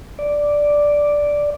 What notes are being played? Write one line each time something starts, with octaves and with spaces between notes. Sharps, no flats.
D5